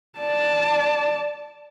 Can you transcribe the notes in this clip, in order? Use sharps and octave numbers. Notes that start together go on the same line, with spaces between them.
D5 A5